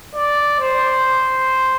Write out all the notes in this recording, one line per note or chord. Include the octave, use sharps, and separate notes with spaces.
D5
C5